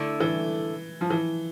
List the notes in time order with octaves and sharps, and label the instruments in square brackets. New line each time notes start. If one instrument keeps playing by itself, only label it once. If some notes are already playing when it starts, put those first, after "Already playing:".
Already playing: [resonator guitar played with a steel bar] D3 A3 E4 A4
[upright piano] E3
F3
E3